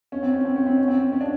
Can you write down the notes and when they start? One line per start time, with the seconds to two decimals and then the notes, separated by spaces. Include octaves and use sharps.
0.12 C#4
0.23 C4
0.34 C#4
0.45 C4
0.56 C#4
0.66 C4
0.77 C#4
0.88 C4
1.12 C#4
1.21 D4